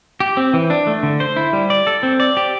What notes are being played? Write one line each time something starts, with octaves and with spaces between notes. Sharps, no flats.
G4
C4
E3
D4
A3
D3
C5
E4
G3
D5
A4
C4
D5
G4